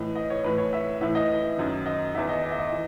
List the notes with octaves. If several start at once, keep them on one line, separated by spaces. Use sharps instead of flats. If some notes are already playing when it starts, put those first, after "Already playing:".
Already playing: A2 E3 D#5
D#5
C#5
A2 E3 B4
C#5
E5
A2 E3 E5
D#5
F#2 D#3
D#5
E2 D#3 E5
D#5
D#5
E5
D#5
E3